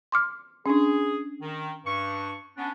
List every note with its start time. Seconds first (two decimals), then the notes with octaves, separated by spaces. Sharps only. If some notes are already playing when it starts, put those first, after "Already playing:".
0.12 C6 D6 F6
0.66 C#4 D4 G#4
1.42 D#3
1.85 G2 C#6
2.57 B3 C#4 D4